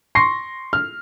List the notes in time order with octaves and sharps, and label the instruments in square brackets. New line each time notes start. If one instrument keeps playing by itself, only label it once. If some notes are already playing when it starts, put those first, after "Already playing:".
[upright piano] C6 C#6 A#6 C7
F6